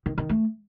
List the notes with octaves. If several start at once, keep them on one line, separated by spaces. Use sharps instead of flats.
D#3
D#3
A3